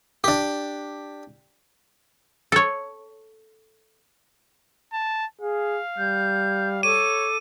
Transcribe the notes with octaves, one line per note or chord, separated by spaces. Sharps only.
D4 G4
A4 C#5
A5
G#4 F5
G3 G6
A4 C#5 D6 D#7